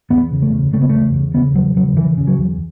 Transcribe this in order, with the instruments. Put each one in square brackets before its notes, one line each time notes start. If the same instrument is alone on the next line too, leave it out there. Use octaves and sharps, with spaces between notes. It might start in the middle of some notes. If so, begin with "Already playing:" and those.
[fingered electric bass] E2 B3
C#3
A3
C#3
C#3 A3
B3
E2 A3
E2
C#3 B3
E2 F#3
C#3 F#3
E2 E3
C#3
F#3
E2